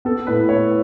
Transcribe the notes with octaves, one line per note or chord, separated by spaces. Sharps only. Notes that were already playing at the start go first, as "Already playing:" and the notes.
B3 A4
A2 B4
A2 C#5